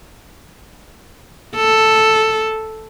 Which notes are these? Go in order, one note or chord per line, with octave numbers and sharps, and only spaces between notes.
A4